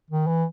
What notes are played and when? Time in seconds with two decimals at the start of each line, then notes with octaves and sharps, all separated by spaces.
0.11 D#3
0.27 E3